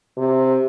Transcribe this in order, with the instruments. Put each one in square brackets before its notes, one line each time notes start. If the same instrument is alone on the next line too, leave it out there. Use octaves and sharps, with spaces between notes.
[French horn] C3